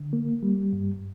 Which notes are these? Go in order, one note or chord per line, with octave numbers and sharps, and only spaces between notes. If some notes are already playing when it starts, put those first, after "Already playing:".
Already playing: D3
A#3
G3
G2